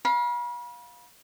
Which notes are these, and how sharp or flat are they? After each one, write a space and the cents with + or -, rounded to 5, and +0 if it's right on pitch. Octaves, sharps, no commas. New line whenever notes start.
F5 +15 B5 -35